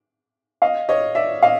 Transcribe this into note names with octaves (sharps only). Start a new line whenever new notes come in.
D#5 F5
C#5 D#5
D5 E5
D#5 F5